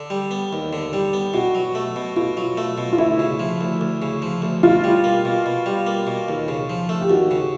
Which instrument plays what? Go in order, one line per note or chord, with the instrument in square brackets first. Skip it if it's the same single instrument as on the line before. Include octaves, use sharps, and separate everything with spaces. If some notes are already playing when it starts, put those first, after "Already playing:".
Already playing: [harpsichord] D3
G3
B3
D#2
D3
[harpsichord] G3 [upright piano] G4
[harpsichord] B3
[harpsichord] B2 [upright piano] F#4
[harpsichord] F#3
A3
B2
[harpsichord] B2 [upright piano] F4
[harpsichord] F#3
A3
B2
[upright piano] F4
[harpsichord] D2 [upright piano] E4
[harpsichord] C#3
F3
D2
D2
C#3
F3
D2
[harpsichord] B2 [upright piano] F4
[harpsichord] G3
A#3
B2
B2
G3
A#3
B2
D#2
C#3
F3
A3
[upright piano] G4
[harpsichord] D#2 [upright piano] F#4
[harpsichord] C#3